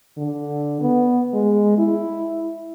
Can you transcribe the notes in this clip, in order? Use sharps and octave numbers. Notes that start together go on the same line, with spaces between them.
D3
B3
G#3
E4